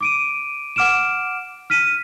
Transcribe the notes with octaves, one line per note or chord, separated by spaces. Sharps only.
D6 D7 D#7
F#5 D6 F6 D7 E7
F6 B6 D#7